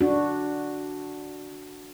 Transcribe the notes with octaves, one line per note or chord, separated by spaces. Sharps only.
D4 F#4